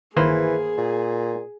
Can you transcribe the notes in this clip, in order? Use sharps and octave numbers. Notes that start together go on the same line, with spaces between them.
G1 D#3 E3 A#3 G#4 B4 C5
A#2